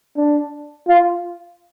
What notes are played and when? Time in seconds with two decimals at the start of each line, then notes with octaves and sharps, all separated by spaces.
0.17 D4
0.88 F4